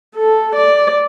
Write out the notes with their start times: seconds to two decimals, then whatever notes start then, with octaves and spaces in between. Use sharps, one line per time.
0.16 A4
0.55 D5